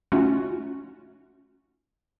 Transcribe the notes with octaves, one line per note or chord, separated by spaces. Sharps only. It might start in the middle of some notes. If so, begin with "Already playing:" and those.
A3 C#4 D#4 F4 F#4